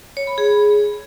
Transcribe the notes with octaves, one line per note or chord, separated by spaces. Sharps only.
C#5
B5
G#4